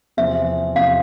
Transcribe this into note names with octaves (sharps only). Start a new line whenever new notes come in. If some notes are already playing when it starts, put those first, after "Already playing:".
E2 C3 F3 E5
E2 C3 F3 F5